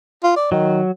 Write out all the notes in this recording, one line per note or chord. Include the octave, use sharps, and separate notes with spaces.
F4
D5
D#3 F#3